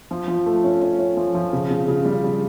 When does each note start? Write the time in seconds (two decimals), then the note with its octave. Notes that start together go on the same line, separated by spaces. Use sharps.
0.11 F3
0.28 F3
0.46 A3
0.64 C#4
0.82 C#4
0.99 C#4
1.17 F3
1.34 F3
1.53 C#3
1.71 C#3
1.88 C#3
2.05 G3
2.24 C#3